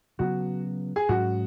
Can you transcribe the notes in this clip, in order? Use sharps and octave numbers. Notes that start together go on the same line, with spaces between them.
C#3 F#3 B3 F#4
G#4
G#2 F#3 C#4 F#4